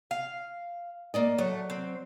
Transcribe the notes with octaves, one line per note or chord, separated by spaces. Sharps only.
F5
A#3 D5 D#5
F#3 A3
C4